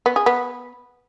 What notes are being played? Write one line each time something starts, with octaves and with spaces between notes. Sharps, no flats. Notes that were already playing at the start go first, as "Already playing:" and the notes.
B3
G#4
B3